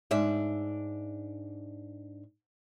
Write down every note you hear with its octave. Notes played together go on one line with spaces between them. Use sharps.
G#2 D4 E5